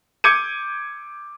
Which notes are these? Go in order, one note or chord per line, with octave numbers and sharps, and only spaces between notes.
D6 G6 G#6 C#7 D#7